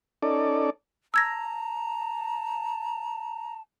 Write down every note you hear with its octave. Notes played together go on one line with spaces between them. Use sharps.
C#4 D#4 A4 D5
A5 A#5 E6 G#6 A#6